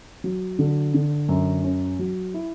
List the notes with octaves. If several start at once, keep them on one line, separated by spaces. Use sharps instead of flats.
F#3
D3
D3
F#2
C#4
F#3
E4